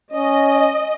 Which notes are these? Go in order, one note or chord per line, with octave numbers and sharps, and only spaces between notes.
C#4 D#5